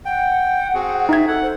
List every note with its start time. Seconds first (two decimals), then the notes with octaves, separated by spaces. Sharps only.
0.05 F#5 G5
0.74 C4 F#4 G#4
1.09 D#4 E5 G#6
1.27 A4 F#5
1.42 C5